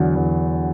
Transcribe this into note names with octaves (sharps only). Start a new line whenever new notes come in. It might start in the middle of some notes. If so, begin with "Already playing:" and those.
Already playing: E2 D3 F#3
E2